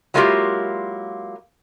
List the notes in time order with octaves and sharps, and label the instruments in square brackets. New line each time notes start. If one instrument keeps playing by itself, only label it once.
[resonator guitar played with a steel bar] F#3 G#3 A#3 E4 F4 G4